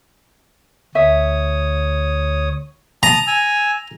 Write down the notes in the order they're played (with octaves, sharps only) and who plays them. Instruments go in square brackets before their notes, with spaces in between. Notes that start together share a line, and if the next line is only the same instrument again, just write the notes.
[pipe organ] D2 C#5 D#6 [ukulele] E5
[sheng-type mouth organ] A5 D#6 [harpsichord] A#5
[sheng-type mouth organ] G#5 E6